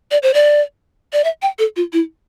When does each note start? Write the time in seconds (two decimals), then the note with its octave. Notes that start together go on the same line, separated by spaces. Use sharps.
0.11 D5
0.23 C5
0.34 D5
1.13 D5
1.24 E5
1.42 G5
1.59 A4
1.76 F4
1.93 E4